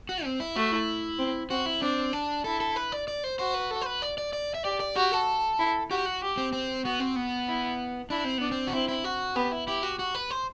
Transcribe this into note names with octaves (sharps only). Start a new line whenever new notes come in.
F#4
C4
E4
A3 F#4
E4
C4
C4 F#4
E4
C4 D4
D4
E4 A4
A4
B4
D5
D5
C5
F#4 C5
B4
A4
C5
B4
D5
D5
D5
E5
G4 D5
D5
F#4 G4
A4
E4
F#4 G4
F#4
G4
C4
C4
B3 F#4
C4
B3
E4
D4 E4
C4
B3 D4
C4
F#4
C4 E4
E4
F#4
B3 G4
E4
E4 G4
F#4
F#4
B4
C5